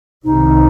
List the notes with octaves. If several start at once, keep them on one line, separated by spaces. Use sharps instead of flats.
C2 C3 D#3 D#4